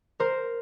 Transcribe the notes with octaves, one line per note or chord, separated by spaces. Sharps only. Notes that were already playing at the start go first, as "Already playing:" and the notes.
A#4 C5